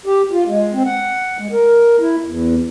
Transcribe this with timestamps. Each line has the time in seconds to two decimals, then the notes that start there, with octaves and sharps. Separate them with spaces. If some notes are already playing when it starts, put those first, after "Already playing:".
0.06 G4
0.31 F4
0.48 G#3
0.73 C4
0.85 F#5
1.39 G#3
1.52 A#4
2.00 E4
2.24 E2